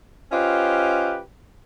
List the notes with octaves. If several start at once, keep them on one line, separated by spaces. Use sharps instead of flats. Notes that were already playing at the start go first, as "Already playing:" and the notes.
C#4 F4 G4 B4 C5 D#5